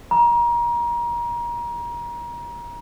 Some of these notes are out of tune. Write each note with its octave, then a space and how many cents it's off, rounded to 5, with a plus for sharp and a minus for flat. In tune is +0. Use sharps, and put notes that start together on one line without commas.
A#5 +30